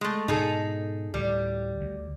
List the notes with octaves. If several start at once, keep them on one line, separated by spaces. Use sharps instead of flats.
G#3 A3
G#2 B2 D#4 G#4 A4
D2 A2 G3
D2